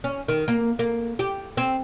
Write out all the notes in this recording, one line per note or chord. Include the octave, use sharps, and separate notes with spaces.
C#4
D#3
A#3
A#3
G4
C4